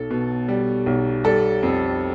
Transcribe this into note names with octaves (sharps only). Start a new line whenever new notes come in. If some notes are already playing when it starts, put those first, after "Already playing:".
Already playing: B1 A4
B2
G3
B1
G3 A4
F2